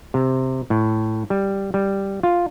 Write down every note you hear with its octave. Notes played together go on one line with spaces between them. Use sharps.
C3
A2
G3
G3
F4